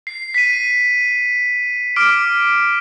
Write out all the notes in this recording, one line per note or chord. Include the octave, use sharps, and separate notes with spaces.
C7
B6 D#7
D6 F6 D7